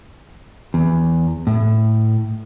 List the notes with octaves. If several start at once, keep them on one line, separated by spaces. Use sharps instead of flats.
E2
A2